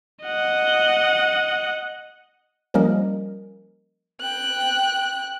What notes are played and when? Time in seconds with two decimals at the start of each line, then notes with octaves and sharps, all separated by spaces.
0.24 D#5 F#5
2.74 F3 G3 A#3 C#4 A#4 D#5
4.22 G5 F#6